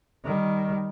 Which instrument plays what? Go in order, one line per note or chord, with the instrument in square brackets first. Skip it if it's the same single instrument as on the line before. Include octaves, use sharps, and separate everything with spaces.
[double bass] D#3 G3